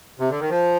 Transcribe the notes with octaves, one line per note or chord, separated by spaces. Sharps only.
C3
D3
D#3
F3